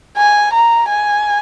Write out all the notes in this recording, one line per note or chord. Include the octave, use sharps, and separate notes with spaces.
G#5
A#5
G#5